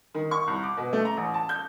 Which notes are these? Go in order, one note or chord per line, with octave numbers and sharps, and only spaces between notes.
D#3
C#6
C2
D6
B2
A3
A#5
A1
A5
G6